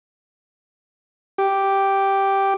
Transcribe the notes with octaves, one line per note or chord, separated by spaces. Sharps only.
G4